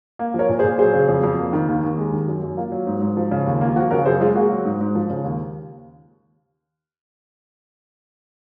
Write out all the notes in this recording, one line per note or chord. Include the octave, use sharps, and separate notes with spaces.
A#3
F3 A#4 C#5
A#2
G#4 C5
A#2
F#3 G#4 C5
C#3
F2
F2
A#3
D#3
D#2
D#2
G#3
D#3
F#2
F#2
A#3 F4
F#3
G#2
G#2
F3
C#3
D#2
A#3 F4
F3 F#4
C#3 F#4 A#4
F#2 G#4 C5
G#3 F4 G#4
A#3 F#4
F#3
G#2
G#2
F3
C#3
D#2